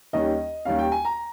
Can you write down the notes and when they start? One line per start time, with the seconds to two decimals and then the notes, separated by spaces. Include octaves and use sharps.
0.13 D#2 D#3 G3 C#4 D#5
0.65 D#2 D#3 G3 C#4 F5
0.79 G5
0.92 G#5
1.05 A#5